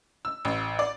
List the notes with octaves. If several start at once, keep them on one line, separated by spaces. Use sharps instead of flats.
E6
A1
D5